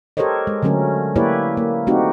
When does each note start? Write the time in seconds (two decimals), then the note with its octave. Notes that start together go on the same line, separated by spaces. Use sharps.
0.17 G4 A4 A#4 C5 C#5 D#5
0.47 G#3
0.63 D3 F#3 A3 C#4 A#4
1.16 A#3 E4 G4 B4 C#5 D5
1.57 A#3
1.87 A3 C4 D#4 F#4 G4